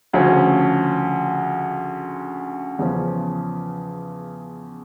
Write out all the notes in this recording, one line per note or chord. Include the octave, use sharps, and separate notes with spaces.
D2 C#3 F3 C#4
E2 C#3 F3 C#4